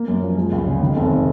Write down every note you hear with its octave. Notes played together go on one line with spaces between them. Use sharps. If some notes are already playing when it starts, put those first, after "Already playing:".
Already playing: A#3
F#2
F3
G#3
C#2
C#3
D#3
F1